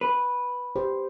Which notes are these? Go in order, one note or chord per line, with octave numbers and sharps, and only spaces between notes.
B4
G4 C5